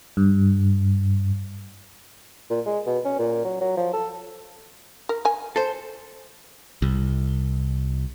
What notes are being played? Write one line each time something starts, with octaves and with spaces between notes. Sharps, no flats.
G2
A#2
G#3
B2
C#4
A#2
F#3
F#3
F3
A4
A#4
A#4 G#5
A4 C5
C2